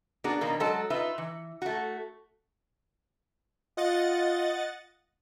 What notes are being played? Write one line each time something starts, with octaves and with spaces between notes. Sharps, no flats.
A#3 B3 D4 F#4 G#4
B2 D#3 A#3
F#3 G#3 A4 A5
D#4 F4 B4 E5
E3
A3 F#4
F4 D#5 F#5 A6